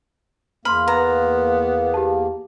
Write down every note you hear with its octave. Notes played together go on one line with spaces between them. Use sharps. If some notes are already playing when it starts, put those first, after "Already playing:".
E2 A#3 B5 C6 F6
B3 A#5
G4 A5